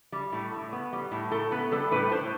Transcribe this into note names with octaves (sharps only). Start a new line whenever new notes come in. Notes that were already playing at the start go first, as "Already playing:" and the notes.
G3
A2
A2
B3
G3
A2
A2 A4
B3 B4
G3 A4
A2 B4
A2 C5